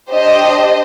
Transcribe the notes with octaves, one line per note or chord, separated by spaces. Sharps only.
D4 G4 C5 D#5